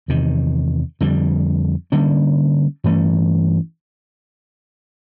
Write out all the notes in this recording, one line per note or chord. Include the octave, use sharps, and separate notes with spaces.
E2 C3 D#3
F2 D3 G3
D3 G3 A#3 C#4
G2 E3 A3 C#4